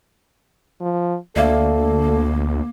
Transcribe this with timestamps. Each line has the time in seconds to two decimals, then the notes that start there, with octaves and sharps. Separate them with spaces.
0.81 F3
1.36 D2 A#3 A4 D5 E5 F5